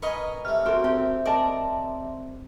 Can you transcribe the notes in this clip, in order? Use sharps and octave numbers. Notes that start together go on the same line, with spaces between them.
A#4 B4 D#5 G#5 A#5 C#6
C3 A3 F6
C4 F#4 A4 A#4
C4 G4
A#4 D5 D#5 A5